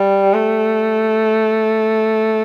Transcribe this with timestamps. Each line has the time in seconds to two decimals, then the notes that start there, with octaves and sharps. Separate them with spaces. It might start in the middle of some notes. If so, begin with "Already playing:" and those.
Already playing: G3
0.34 A3